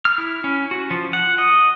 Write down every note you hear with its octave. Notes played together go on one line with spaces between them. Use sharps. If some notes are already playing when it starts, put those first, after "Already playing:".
F6
E4
C#4
F#4
F3
F#5
D#5